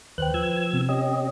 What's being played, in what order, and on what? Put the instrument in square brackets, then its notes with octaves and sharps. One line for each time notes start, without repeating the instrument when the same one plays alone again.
[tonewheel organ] D#2 F#6 [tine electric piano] B4 C5 G5
[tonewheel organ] F3 E6 G#6
[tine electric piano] C3 B3 C4
[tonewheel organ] C#4 G4 D#5